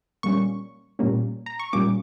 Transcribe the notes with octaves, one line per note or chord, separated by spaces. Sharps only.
A#2 G3 A#3 C#4 C#6
A#2 G3 A#3 C#4
A#5
C#6
A#2 G3 A#3 C#4 D6